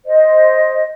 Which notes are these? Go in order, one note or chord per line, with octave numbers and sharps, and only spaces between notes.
C5 D#5